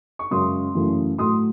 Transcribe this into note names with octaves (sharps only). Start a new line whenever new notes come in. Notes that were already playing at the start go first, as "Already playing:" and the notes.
C#6
F#2 C#3 G#3 C6 D#6
F#2 C#3 E3 A3
A2 F#3 A3 C6 D#6